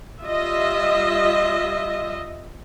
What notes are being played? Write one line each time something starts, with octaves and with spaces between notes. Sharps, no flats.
G3 F4 D#5 E5